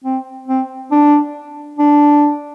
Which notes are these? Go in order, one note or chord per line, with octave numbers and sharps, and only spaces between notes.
C4
C4
D4
D4